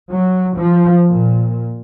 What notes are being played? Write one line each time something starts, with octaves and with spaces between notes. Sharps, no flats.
F#3
F3
A#2